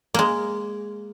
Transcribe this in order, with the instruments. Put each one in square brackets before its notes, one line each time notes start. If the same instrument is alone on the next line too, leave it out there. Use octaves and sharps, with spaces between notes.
[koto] G#3 A#3